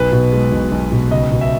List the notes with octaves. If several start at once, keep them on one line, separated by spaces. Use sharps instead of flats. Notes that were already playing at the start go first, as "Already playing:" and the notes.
Already playing: B1 B4
B2
G#3
B1
B1
B2
C#2 D#5
B2
E5